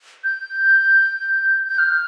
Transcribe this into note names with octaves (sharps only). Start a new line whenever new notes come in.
G6
G6
F6